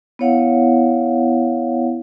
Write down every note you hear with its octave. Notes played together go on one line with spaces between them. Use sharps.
B3 E4 C#5 F5 F#5